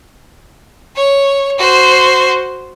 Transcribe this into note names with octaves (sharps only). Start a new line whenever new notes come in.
C#5
F#4 C5